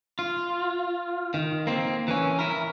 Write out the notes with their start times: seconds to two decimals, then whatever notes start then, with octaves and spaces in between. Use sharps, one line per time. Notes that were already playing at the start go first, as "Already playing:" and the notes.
0.19 F4
1.34 D#3
1.67 A#3 C4
2.08 E3 C#4
2.39 E4 A#4